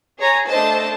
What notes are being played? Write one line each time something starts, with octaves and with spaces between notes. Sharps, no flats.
G#4 C#5 A#5
A3 D4 A4 C5 D#5 A5